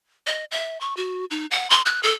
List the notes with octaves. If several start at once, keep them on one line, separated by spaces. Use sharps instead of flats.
D#5
E5
C#6
F#4
D#4
F#5
C6
F#6
A4